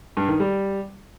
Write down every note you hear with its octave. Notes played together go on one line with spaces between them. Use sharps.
G2
D#3
G3